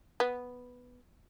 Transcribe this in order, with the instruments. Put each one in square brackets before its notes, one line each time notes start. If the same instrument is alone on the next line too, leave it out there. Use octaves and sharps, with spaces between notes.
[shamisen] B3